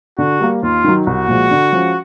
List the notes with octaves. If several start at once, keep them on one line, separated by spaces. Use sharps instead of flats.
D3 F#4
G3 A#3
D#2 F4
D#3 F#3
C2 F#4
A#2 F3 G#3
D3
F3 G#3 C#4 F4